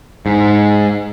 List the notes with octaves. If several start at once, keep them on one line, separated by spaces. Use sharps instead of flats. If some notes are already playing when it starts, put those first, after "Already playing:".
G#2